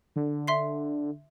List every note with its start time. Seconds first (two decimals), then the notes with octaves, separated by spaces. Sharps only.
0.16 D3
0.48 E5 C6 C7